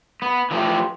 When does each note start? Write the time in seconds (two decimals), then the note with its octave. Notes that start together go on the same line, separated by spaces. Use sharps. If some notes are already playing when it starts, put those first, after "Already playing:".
0.22 B3
0.51 E3 F3 A3 G4